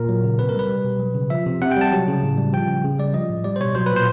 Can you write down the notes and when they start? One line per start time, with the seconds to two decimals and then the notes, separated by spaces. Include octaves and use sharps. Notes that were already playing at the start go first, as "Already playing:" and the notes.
Already playing: A#2 A#4
0.09 F#3
0.24 C#3
0.39 C3 B4
0.49 A#4
0.54 G3 B4
0.69 G3
0.84 B2
1.00 F#3
1.15 C#3
1.30 F3 E5
1.46 C3
1.61 C3 F#5
1.71 G5
1.76 G3 A5
1.92 F#3
2.08 C#3
2.23 A2
2.38 G3
2.53 F3 G5
2.68 C#3
2.84 C#3
2.98 G3 D5
3.14 F3 D#5
3.30 A2
3.44 G3 D5
3.56 C5
3.60 B2 C#5
3.75 F#3 C5
3.86 B4
3.91 A#2 C5